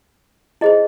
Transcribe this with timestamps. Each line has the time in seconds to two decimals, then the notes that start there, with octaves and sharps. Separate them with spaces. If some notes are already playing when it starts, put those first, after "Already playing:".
0.61 E4 G#4 C5 D#5